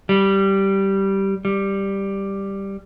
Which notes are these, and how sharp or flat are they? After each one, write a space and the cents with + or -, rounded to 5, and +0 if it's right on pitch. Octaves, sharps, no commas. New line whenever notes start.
G3 -10
G3 +5